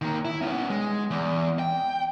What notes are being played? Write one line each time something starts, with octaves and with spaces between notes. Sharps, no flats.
D#3 A#3
E4
B3 C#4
G#3
E2
G5